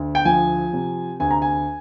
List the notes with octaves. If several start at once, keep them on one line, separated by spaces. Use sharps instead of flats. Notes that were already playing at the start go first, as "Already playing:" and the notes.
Already playing: D2
G5
F3 G#5
C3
D2 G#5
A#5
G#5